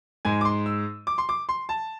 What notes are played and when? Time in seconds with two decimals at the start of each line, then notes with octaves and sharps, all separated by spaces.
0.25 G#2 G#3 G#5
0.41 D6
0.45 C6
0.66 E6
1.07 D6
1.18 C6
1.29 D6
1.49 C6
1.69 A5